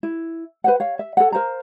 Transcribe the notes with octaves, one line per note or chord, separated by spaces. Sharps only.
E4
B4 C5 F#5
C#5 F5
E5
A4 C#5 F#5
A#4 C5 F5 A#5